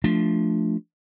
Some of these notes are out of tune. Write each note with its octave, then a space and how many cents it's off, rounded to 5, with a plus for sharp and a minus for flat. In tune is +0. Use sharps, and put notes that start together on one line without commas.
F3 +0 A3 +0 D4 +0